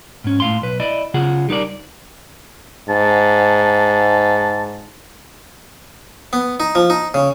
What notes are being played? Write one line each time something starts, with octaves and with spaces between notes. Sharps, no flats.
G#2 C#4
A2 F5 C6
B1 B4
E4 D5 D#5
C#3 F4 G#4 F#5
G3 D#4 A#4 D5
G#2 A5
B3
D#4
F3
D#4
C#3